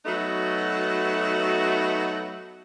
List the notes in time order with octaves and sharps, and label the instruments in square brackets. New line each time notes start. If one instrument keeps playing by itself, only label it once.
[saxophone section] F#3 A3 B3 D#4 F#4